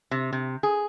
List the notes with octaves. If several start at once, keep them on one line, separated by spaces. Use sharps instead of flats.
C3
C3
G#4